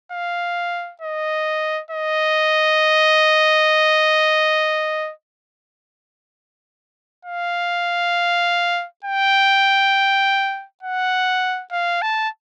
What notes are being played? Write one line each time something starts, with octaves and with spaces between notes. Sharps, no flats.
F5
D#5
D#5
F5
G5
F#5
F5
A5